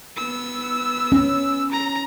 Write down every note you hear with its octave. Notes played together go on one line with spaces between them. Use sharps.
B3 E6
C#4
A#5